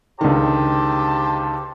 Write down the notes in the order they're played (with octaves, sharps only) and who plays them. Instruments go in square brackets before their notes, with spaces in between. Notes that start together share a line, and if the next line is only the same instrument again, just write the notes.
[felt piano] C#2 D3 D#3 [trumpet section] G4 C5 A5